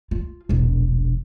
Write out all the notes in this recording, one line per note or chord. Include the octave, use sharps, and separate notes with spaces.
F4
E1 A#1